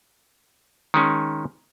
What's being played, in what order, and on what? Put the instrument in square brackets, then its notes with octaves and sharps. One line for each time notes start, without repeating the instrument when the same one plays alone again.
[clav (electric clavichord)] D#3 G#3 C#4